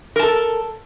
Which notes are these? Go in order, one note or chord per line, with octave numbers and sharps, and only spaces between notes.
A4 A#4 A5